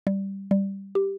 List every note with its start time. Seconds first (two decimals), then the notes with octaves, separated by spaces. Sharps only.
0.07 G3
0.51 G3
0.95 G4